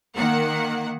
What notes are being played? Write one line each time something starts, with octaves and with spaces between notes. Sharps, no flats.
D#3 A#3 F#5